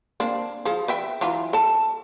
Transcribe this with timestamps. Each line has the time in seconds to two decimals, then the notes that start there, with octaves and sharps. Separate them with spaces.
0.20 A#3 C4 D4
0.65 F3 G#4
0.88 B4 E5 G5
1.21 E3 F#3 F4
1.53 A4 A5